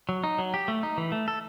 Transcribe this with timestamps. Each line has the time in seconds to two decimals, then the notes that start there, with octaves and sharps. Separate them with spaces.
0.09 F#3
0.24 D#4
0.39 F#3
0.54 G4
0.68 A3
0.83 D#4
0.98 E3
1.12 A3
1.28 A4